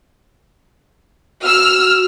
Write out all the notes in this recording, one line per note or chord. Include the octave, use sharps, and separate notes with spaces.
F#4 E6 F6